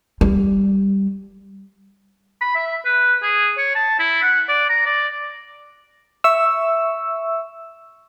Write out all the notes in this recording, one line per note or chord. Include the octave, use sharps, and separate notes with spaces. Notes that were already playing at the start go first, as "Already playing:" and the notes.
G3
B5
E5
B4
G#4
C#5
A5
E4
F#5
D5
A#5
D5
E5 C#6 E6